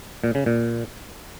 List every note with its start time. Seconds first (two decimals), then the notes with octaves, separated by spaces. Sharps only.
0.24 A#2
0.35 C#3
0.46 A#2